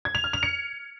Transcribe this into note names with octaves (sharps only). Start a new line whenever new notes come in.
G#6
F7
F6
F7
C#7